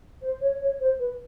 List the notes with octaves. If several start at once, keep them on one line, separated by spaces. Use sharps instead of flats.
C5
C#5
C#5
C5
B4